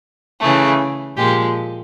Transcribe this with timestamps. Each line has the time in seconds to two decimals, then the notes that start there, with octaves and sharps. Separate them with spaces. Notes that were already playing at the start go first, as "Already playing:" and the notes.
0.42 C#3 E3 A3 G#4
1.17 A#2 F3 G#3 G4